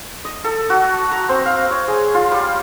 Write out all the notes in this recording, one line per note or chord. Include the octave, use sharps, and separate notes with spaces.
D#5
A4
F#4
A#5
C4
F5
C#5
G#4
F4
G3